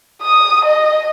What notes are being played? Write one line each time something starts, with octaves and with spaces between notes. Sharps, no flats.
D#6
D#5